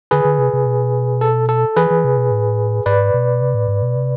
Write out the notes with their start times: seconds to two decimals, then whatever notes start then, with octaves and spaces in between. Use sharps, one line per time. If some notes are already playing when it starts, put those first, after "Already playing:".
0.11 D3 G#4 B4
0.25 D3
0.39 C3
0.53 C3
0.66 B2
1.21 A4
1.49 A4
1.76 E3 G#4 B4
1.90 E3
2.04 C3
2.17 B2
2.31 A2
2.86 G#2 B4 D5
3.14 B2
3.41 C3
3.54 A2
3.68 G#2
3.82 B2
3.96 C3